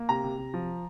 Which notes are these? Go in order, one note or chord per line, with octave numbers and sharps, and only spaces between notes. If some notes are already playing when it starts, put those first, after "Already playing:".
Already playing: A#3
C3 A#5
C3
C3
F3